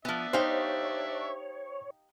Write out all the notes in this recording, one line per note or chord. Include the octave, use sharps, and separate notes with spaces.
F3 B3 D4 D5 E5
D#4 G4 C5 C#5 F5